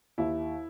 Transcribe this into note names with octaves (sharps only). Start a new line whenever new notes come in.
D#2 E4